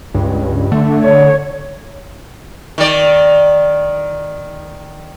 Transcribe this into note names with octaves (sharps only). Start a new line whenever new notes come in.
C#2 G2
D3 A3
C#5
D#3 D5